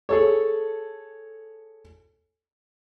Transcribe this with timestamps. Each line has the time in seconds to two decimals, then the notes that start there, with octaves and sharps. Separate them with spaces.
0.09 G#4 A4 C#5